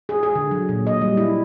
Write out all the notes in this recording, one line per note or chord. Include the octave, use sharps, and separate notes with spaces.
G#4
G#4
D3
F#3
A#2
D#5
G3
E4